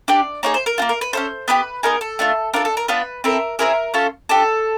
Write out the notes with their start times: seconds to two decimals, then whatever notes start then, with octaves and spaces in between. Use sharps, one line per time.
0.08 D4 G4 D5
0.43 A#3 D#4 G#4 C#5
0.54 C5
0.66 A#4
0.78 A#3 D4 F4
0.89 A#4
1.01 B4
1.13 C#4 E4 A4 C5
1.48 B3 D4 G4 B4
1.83 B3 D#4 G#4 A#4
2.01 A4
2.19 A3 D4 F4
2.54 D4 F4 A4 A#4
2.65 A4
2.77 A#4
2.88 B3 D4 F4 B4
3.24 C4 E4 A4 A#4
3.59 C4 E4 G#4 A#4
3.94 C#4 F4 A4
4.29 D4 G4 A4